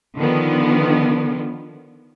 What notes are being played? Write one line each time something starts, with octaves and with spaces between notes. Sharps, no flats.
D3 D#3 F3 B3